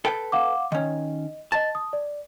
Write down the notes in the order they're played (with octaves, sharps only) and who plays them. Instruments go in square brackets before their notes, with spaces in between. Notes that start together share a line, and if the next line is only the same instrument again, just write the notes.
[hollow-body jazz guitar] A4 B4 G5
[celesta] F5 F#5 D6
[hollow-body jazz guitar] D#3 C#4 [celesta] D#5
[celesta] D#5 A6 [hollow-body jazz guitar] A5
[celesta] D#6
D5